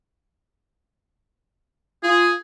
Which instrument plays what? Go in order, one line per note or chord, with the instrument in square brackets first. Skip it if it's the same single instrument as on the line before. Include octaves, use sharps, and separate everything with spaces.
[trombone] F4 [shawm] G#4